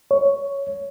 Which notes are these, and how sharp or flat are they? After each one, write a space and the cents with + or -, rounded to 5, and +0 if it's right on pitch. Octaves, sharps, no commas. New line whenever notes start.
C#5 +10